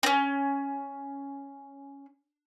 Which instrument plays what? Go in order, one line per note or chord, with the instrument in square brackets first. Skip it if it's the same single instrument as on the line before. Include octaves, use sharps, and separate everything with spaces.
[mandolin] C4 C#4